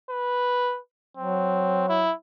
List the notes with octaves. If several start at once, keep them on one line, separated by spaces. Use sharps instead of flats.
B4
F#3 C4
E4